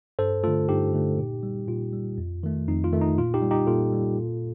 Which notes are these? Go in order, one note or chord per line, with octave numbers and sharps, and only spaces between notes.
G2 A4 C5
D3 A3 F4 A4
G2 D#4 G4
D3 A3
A#2
G3
A#2 F4
G3
F2
D#3 A3
F2 D#4
F4
D#3 A3
D#4
A#2 F4
D#4 G4
G3
D#4 G4
A#2 F4 A4
G3
A#2